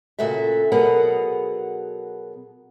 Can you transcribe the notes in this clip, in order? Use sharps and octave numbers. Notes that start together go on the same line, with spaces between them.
A#2 C#3 F#4 A4 E5
B2 F#3 B3 G#4 A#4 F#5